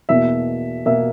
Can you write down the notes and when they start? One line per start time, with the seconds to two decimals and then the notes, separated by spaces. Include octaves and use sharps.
0.09 E2 B2 A#3 E5
0.86 B2 A#3 E5